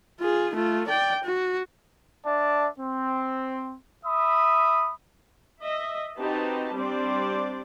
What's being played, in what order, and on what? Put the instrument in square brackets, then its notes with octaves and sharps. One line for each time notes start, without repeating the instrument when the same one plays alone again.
[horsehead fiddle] F4 G#4
A3 F4
D5 G5
F#4
[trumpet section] D4 D5 E5 A5
C4
E5 B5 D#6
[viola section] D#5 E5
C4 D#4 F#4 G4 B4 A5
G3 C4 D4 C5 D5